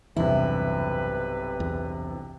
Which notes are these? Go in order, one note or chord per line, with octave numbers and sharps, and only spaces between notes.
B1 E2 G2 C3 E3 E4 B4
E2